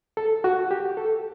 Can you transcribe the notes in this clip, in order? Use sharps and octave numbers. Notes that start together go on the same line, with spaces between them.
A4
F#4
G4
A4